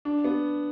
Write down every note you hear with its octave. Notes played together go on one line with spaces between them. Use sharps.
D4
B3